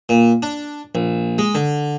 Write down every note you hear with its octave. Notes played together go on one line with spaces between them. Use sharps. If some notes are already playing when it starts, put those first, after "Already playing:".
A#2
D4
A#1
G#3
D3